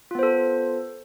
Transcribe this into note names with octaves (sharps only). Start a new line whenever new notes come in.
B3 F4 A4 C5